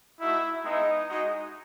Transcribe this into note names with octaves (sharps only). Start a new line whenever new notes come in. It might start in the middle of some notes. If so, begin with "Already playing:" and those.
A3 D#4 E4 F#4 E5
G#3 B3 D#4 E4 D#5
G#3 D#4 F#4